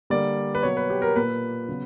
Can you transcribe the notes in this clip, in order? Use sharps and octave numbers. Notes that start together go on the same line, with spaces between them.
D3 G3 A#3 D5
B4
B2 F#3 A#3 C#5
B4
G4
A#4
A#2 A#3 B4
C#3 F#3 B3